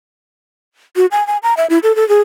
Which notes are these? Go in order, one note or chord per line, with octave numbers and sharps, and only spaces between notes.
F#4
G#5
G#5
A#5
E5
E4
A4
A4
G#4